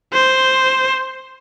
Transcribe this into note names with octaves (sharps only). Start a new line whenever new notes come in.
C5